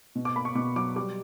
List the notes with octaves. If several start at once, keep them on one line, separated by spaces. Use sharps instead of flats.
B2
D6
A#3 B5
C#6
B2 D6
F#3 D6
G3 D6